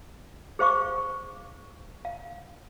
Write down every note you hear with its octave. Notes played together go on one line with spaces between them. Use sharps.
G#4 C5 F5 C#6 D6
F5